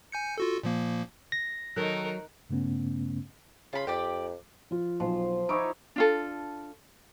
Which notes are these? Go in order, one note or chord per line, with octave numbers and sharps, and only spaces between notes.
G#5 G6 C#7
F4 F#4 A4
A#2 F3 A#3
A#6
D#3 F#3 D#4 A4 A#4 F#6
G2 C#3 A3 B3 C#4
C#3 F4 B5
F2 G4 D5 G5
F3 F4
B1 F3
D#4 E4 C#5 A#5 D6 D7
D4 F4 A4